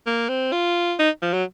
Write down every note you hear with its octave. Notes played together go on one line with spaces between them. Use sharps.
A#3
C4
F4
D#4
F3
F#3